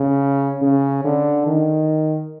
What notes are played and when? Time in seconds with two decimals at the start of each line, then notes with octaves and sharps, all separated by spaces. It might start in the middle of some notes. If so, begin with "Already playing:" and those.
Already playing: C#3
0.62 C#3
1.04 D3
1.47 D#3